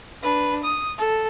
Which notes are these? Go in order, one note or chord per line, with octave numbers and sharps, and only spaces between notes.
D4 B4
D#6
A4